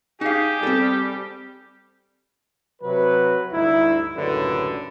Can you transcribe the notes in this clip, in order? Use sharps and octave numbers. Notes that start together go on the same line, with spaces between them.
D#4 G4 G#4 F5
G3 C4 A4
C3 F#3 B4
D2 G2 D#4 E4
C#2 F#2 A2 D3 G4 B4